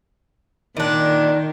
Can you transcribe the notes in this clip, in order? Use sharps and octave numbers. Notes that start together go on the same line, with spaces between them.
A#2 D#3 D4